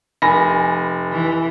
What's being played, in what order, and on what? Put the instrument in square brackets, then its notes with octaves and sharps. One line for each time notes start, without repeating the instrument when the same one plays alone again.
[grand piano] F1 [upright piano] G#5 B5 A#6
[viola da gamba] E3